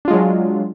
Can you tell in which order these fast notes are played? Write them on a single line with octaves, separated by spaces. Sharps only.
D4 F4 G#3 F#3